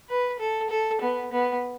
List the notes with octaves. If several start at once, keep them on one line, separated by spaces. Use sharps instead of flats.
B4
A4
A4
B3
B3